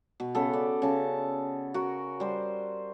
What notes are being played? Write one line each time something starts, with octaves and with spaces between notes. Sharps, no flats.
B2
C#3 B3 A4
D5
C#3 A5
F#4 A#4
G3 C5